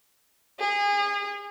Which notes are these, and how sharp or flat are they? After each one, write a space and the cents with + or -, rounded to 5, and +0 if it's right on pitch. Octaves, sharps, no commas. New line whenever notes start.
G#4 -30